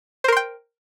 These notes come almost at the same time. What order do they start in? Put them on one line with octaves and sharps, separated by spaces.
C5 A#4 C6 G5